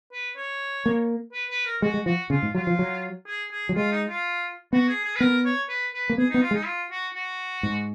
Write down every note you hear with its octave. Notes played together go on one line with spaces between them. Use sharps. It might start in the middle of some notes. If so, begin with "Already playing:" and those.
B4
C#5
A#3
B4
B4
A#4
G#3 F#4
G#3
F3 F#4
C#3 F4
G#2
F#3 F4
F3
F#3
G#4
G#4
F#3
G#3 F4
D#4
F4
B3 F#4
G#4
G#4
B4
B3 A#4
C#5
B4
B4
A#3
B3 G#4
D#4
B3
F4
G#3
D#4
F4
F#4
F#4
G#2